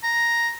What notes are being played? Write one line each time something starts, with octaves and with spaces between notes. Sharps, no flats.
A#5